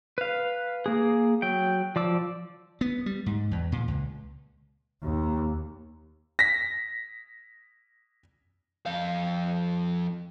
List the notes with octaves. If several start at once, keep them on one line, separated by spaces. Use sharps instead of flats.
B4 F5
A#3 G#4
F#3 G5
F3 D5 D6 E6
B3
G3
G#2
E2
A#2
C#2
D#2
A#6 B6
F2 F5